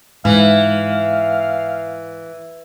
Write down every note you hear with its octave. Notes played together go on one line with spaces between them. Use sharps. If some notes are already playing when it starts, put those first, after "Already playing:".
G#2 E3 F5